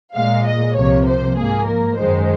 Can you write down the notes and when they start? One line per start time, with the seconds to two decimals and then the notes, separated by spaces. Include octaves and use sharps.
0.15 A#2 G#3 F5
0.46 D#5
0.76 C2 C3 F3 A#3 C#5
1.06 C5
1.37 G#2 F3 A#3 G#4
1.67 A#4
1.97 F#2 D#3 G#3 C5